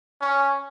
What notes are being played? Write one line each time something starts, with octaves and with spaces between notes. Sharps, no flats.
C#4